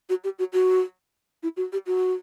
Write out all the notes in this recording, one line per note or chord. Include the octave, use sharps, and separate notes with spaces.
F#4
G4
F#4
F#4
E4
F#4
G4
F#4